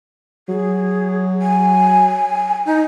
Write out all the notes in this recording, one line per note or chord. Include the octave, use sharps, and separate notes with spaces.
F#3 G#4
G#5
D#4